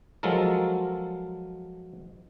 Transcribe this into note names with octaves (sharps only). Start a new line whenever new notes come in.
F3 F#3 G#3 A4 A#4